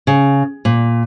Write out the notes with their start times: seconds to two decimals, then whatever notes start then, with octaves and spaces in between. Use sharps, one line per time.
0.07 C#3
0.65 A#2